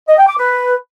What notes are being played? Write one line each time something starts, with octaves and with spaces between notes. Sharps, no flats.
D#5
G5
D6
B4